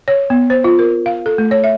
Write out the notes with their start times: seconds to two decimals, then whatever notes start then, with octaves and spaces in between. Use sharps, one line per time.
0.08 C#5
0.30 B3
0.50 C5
0.64 F4
0.79 A#4
1.06 F5
1.26 A4
1.38 A3
1.51 C#5
1.64 E5